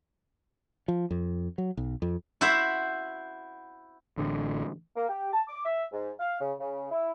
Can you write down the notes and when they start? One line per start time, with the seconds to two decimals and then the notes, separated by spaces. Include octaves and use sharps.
0.88 F3
1.11 F2
1.58 F#3
1.77 B1
2.02 F2
2.41 E4 F#4 C5 E5
4.18 A1 A2 D3
4.96 A#3
5.09 G4
5.33 A5
5.48 D6
5.64 E5
5.92 G#2
6.20 F5
6.40 C#3
6.59 C#3
6.91 E4